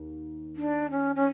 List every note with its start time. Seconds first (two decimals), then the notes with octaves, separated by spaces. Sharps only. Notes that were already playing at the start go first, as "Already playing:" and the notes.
Already playing: D#2
0.56 D4
0.90 C#4
1.16 C#4